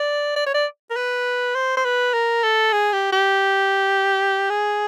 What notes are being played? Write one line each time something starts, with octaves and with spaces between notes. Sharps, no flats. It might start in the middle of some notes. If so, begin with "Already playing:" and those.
Already playing: D5
D5
C#5
D5
A#4
B4
C5
C5
B4
A#4
A4
G#4
G4
G4
G#4